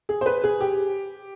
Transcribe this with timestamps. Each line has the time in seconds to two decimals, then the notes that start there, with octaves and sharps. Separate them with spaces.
0.09 G#4
0.21 C5
0.26 B4
0.44 G#4
0.61 G4